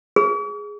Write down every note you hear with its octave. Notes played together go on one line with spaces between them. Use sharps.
G#4